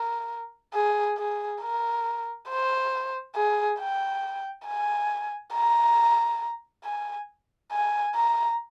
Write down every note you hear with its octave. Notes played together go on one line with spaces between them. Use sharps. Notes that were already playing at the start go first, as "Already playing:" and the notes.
Already playing: A#4
G#4
G#4
A#4
C5
G#4
G5
G#5
A#5
G#5
G#5
A#5